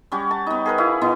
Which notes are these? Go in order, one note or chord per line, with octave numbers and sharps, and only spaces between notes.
G3 C#4 F#4
A5
B3 D#4
G#4 A#4 B4
E4 F#4 F5
B2 B3 D#4 E4